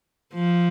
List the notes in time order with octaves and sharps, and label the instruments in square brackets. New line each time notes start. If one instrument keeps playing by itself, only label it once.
[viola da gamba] F3